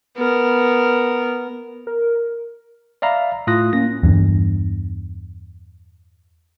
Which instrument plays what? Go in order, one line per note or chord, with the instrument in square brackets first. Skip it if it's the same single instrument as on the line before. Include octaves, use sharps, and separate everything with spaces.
[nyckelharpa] B3 A#4
[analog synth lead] A#4
[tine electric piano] D5 E5 F5 A#5 B5
A2 F4 D#6 F#6 A#6
A#3 C#4 A#6
[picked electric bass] E2 G2